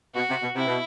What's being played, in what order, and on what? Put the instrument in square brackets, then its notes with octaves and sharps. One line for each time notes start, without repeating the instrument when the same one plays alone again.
[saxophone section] B2 [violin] F#4
[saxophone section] C3
B2
[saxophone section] C3 [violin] E4
[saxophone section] B2